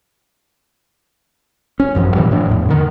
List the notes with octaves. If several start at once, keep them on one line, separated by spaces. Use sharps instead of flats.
C#4
A1 F#2 F3
A#2 D#3 E3 G3
A2 F3 D4
E2 A2
D3 D#3